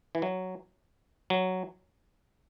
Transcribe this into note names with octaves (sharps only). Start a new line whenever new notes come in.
E3
F#3
F#3